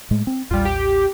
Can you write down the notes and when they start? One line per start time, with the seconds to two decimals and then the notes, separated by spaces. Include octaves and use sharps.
0.11 A2 G#3 A3
0.27 C4
0.51 A1 D#2 G3 F4
0.65 G4